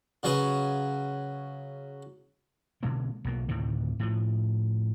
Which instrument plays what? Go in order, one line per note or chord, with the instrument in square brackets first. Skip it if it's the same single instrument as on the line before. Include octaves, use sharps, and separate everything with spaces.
[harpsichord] C#3 F#3 G#4 B4
[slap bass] B2 D3 G#3 A#3
B1 B2 A#3
D2 A2 C3 D#3
A2 F3